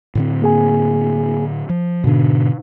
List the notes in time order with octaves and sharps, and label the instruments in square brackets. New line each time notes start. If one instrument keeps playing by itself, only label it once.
[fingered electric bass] A2 D3 C4
[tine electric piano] A#3 G#4 G#5
[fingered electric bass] F3
[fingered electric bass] G#2 D4 [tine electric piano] B2 D3